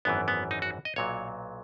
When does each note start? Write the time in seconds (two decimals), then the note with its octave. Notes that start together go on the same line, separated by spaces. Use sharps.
0.05 G#1 F#2 E3 B3
0.28 B3
0.51 D#4
0.62 F#4
0.85 D#5
0.96 B1 A#2 F#3 C#5